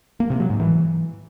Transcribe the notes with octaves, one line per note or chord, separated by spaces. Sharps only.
A#3
C3
F#3
G#2
E3